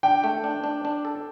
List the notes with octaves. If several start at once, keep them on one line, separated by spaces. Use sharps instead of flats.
D4 G5
A3
D4
D4
D4
A4